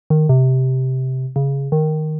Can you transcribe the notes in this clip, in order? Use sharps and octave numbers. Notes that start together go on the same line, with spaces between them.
D#3
C3
C#3
D#3